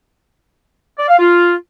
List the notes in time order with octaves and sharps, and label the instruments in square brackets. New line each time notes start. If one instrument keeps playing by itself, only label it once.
[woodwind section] D5
F5
F4